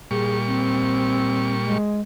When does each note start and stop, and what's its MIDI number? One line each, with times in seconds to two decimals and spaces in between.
0.11 1.78 46
0.11 1.78 55
0.11 0.38 68
0.11 1.78 85
0.47 1.54 60
1.64 2.00 56